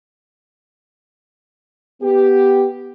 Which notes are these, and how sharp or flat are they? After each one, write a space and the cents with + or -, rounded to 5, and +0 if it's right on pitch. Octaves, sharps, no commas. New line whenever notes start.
B3 +0 G4 +0